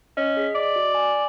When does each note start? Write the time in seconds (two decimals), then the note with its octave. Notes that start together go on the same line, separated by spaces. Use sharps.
0.17 C#4 D#5
0.37 G#4 B6
0.55 D5 D#5
0.76 F#4
0.95 G#5